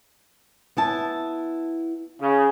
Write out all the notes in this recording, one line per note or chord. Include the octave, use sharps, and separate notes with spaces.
B3 E4 A5
C#3